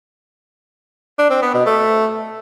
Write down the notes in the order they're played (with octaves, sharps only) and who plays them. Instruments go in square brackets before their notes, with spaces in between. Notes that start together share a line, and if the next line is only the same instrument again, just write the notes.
[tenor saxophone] D4
C4
B3
B2
A3